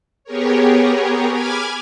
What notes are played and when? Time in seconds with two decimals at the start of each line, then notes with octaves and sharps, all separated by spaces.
0.24 B3 G4 G#4 A#4 C#5
1.30 G#5 B5 D6 F6 G#6